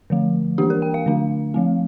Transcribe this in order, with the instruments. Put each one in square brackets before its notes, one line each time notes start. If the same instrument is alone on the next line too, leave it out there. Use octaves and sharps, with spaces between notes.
[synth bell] D3 F3 A3
E3 A#3 D4 G4
A#4
G5
F5
D3 A3 D4
F3 A3 C4